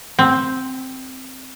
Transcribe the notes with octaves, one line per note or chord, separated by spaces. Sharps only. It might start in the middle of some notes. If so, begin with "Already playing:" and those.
C4